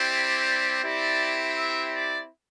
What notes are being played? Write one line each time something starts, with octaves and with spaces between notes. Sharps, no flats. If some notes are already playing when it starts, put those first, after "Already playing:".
Already playing: G3 C4 E4 G4
D5
C4 E4 G4 D5
E5
D5